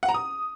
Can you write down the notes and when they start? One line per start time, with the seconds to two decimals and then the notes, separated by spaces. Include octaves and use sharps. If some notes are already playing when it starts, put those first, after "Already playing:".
0.03 F#5
0.09 A#5
0.14 D#6